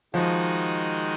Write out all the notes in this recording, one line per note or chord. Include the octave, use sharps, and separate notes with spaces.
D#3 F3 G#3 D#4 F#4